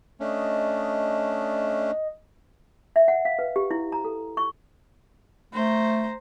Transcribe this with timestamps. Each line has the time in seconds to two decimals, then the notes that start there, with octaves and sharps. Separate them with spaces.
0.20 A3 C#4 D4 D#5
2.96 E5
3.08 F#5
3.25 F5
3.39 B4
3.56 G4
3.71 E4
3.92 A#5
4.05 A4
4.37 C#6
5.54 A3 C5 A#5